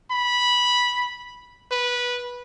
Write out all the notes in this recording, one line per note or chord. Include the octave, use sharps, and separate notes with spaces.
B5
B4